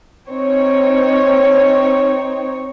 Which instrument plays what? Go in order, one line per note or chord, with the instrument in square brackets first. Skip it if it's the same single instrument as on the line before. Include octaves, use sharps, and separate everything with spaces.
[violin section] C4 D#4 C#5